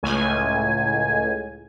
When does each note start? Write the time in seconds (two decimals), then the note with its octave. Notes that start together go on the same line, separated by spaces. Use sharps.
0.03 C#2 A2 G#5